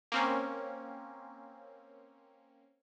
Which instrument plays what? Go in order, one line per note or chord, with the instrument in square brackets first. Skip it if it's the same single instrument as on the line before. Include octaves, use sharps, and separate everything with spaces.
[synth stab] A#3 C4 C#4